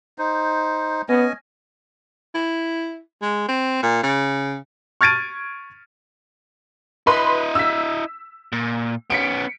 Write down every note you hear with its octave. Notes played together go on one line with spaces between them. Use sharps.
D#4 C5
B3 C#4 D#5 G#5
E4
G#3
C4
A#2
C#3
C#6 F6 G#6 A6 D7 D#7
E4 B4 D#5 B5 C6
E6 B6
A#2
B3 C#4 B6 C#7 D7